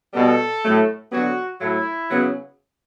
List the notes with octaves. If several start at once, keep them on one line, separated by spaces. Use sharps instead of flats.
B2 G3 B3 A4
A2 F#3 A3
D3 F#3 B3 F#4
A2 F#3 A3 E4
C#3 F#3 B3